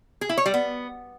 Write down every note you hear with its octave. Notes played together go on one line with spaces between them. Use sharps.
G#4
E4
C#5
G3
B3